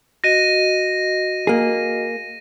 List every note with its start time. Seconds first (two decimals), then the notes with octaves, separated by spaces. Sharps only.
0.24 F#4 D#5 A#6 D#7
1.47 A#3 G#4